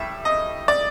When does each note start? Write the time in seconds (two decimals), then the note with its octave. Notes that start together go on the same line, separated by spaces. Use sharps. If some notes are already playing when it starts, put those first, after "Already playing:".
Already playing: A2 G3 E5
0.25 D#5
0.68 D5